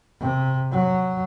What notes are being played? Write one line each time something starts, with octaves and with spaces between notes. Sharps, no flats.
C3
F#3